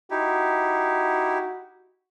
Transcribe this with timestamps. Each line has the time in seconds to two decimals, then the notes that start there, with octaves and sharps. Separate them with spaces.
0.11 D#4 E4 F#4 G4